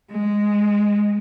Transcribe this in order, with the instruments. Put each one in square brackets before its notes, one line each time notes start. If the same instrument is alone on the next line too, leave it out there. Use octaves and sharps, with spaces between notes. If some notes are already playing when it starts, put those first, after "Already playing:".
[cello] G#3